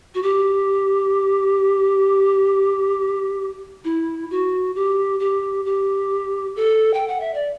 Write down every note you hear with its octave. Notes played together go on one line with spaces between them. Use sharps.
F#4
G4
E4
F#4
G4
G4
G4
A4
G5
F#5
E5
D5